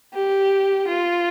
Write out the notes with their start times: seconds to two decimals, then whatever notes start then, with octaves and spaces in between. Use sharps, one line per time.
0.14 G4
0.87 F4